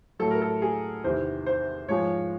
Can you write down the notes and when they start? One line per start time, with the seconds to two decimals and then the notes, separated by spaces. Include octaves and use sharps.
0.19 A2 F#3 A4
0.30 A#4
0.42 A4
0.62 G#4
1.04 E2 C3 D#3 C5
1.46 C5
1.88 G#2 F3 G#3 C#5